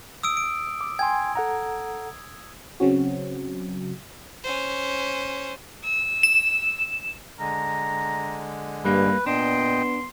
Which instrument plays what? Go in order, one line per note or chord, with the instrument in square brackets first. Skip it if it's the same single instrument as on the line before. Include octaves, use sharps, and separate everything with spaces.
[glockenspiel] D#6 E6 D7
D7
[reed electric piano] D6
[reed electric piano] G5 G#5 C6 [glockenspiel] G#6
[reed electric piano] A4 F#5 A#5
[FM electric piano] C#3 F#3 C4 C#4 F#4
[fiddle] C#4 C5
E6
[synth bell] E7
[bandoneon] D3 G#3 [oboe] A#5
[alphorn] G2 [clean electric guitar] G3 A#3 [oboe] B4
[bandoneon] A#2 D#5 G5 [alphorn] B3 [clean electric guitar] D4 [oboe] C6